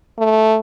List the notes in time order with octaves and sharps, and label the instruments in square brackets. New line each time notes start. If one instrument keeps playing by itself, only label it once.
[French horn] A3